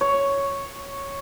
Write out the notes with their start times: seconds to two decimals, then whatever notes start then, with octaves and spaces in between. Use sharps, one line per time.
0.01 C#5